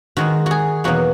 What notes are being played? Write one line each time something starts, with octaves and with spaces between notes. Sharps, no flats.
D#3 G#3 D#4 F#4
F#4 G#4
E2 B2 F#3 A#3 D#4 F#4